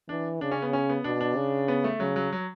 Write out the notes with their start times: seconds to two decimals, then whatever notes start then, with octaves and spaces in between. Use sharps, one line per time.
0.09 E3 D4
0.41 C#3 D4
0.51 C#4
0.62 B3
0.73 C#4
0.89 B3
1.04 B2 D4
1.21 D4
1.37 C#3
1.68 B3
1.84 A3
2.00 C#3 F#3
2.16 F#3
2.33 F#3